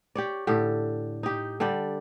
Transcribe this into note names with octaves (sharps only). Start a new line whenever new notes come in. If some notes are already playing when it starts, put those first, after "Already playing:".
G4 C#5 D5
A2 D3 G4
D#4 G4
D3 G3 D5 G5